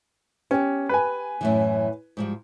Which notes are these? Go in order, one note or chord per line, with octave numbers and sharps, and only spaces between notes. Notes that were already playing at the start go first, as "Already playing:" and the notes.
B3 C#4 G4
B4 G#5
F#2 A2 E3
G#2 F3 G3